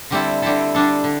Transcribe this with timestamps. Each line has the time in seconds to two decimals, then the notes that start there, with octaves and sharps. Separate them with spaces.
0.11 D3 G3 C4 E4 A4
0.42 D3 G3 C4 E4 A4
0.75 D3 G3 D4 A4
1.04 D3